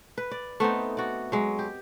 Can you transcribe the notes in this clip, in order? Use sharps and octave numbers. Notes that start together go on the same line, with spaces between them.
B4
D5
A3 B3 C4 D#4
F#4 D5
F#3 G#3
G4